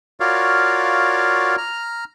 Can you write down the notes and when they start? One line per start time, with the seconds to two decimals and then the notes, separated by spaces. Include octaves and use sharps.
0.20 F4 F#4 A#4 C#5 D5 F5
1.58 A#5 F6